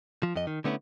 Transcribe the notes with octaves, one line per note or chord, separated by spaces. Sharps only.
F3
F2 D#5
D#3
D3 A3 B3 C#4 E4